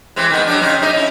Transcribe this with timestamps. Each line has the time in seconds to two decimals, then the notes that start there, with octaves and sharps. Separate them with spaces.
0.16 E3 G#3 C4
0.30 D#3 G#3 B3
0.47 F#3 G3 D4
0.61 C#3 C4 D#4
0.81 G3 D#4 D#5
0.93 C#4 E4